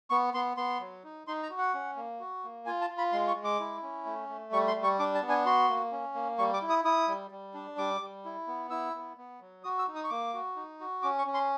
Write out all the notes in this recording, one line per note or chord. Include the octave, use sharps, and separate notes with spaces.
B3 C#6
B3 C6
B3 C6
F#3
D#4
D#4 C6
A#5
F#4
F#5
C#4
A#3
F#4
A#3
F4 G#5
A5
F4
B5
G#3 C6
C#6
G#3
D6
E4
C#4
A3
A3
G3 C#6
C6
G3
C#6
D4 D6
A5
B3
G#5
F#4 C6
A#3
C#4
A#3
G3 C#6
D6
E4
D#6
E4 D#6
G3
G3
D4
G3 D6
G3
E4
B3
E4 E6
B3
B3
F#3
F#4 D#6
E6
D#4
D#6
C#6
A#3 D6
F#4
D#4
F#4
C#4 D6
C#6
C#4
C6